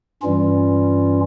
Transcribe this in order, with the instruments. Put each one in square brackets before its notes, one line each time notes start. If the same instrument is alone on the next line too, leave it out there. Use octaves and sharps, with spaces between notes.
[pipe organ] G2 E3 G3 C#4 F4